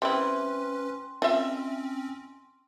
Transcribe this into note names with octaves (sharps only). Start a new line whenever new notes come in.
G3 C4 C#4 E4 B4 G5 C6
C4 C#4 F4 D#5 E5